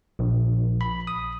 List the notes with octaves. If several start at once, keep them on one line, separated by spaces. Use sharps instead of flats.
A#1
B5
D#6